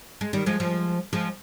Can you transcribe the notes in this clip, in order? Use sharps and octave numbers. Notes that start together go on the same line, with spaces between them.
G#3
D#3 G3
F3 G#3
F3 G#3
F3 G#3